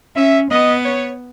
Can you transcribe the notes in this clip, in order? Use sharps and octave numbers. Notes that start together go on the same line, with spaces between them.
C#4 E5
B3 D#5
C#5